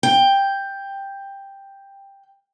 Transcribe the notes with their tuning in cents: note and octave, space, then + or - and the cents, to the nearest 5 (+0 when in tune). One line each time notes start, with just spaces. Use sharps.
G5 +10